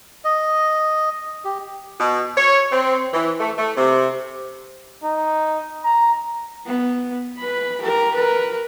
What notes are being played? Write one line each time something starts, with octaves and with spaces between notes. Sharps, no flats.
D#5
G4
B2
C#5
C4
E3
A3
A3
C3
D#4
A#5
B3
B4 B5
G4 A#4
A#4 B4